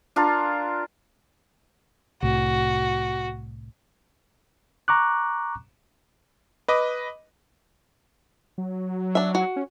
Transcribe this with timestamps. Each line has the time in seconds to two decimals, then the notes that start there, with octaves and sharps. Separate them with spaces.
0.16 D4 F4 A#4
2.23 C2 A2 F#4
4.88 A#5 C#6 D6 F#6
6.68 B4 D#5 D6
8.58 F#3
9.15 D4 E5
9.35 F#4
9.56 C#4